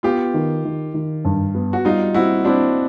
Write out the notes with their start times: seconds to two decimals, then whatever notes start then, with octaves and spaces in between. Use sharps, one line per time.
0.03 B3 F4 G4
0.34 D#3
0.65 D#3
0.94 D#3
1.25 G2
1.55 B3
1.73 F#4
1.85 G3 D#4 F4
2.14 C4 E4 F#4
2.45 C4 D4 E4